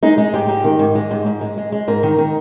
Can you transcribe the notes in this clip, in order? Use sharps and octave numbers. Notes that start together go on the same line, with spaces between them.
G#3 D#4
G#3
G#2 G4
G#2
D#3
G#2
G#3
G#2
G#2
G#3
G#3
G#3
G#2 A#4
D#3
D#3